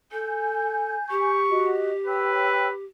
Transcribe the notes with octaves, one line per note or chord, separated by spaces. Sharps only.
A4 G#5 G6
G4 C#6
F#4 D#5
B4 C#5 G5 E6